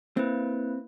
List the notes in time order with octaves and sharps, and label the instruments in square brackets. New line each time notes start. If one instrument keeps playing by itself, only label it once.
[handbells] A#3 E4 B4 [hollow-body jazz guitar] C4